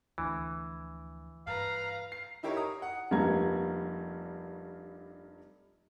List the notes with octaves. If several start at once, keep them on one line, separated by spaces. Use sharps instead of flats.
D2 E3 F3
G2 B4 F5 A#5
C7
D#4 E4 G4 A#4 C#5
A#5 D#6
F#5
F1 G2 G3 A#3 A#5 G#6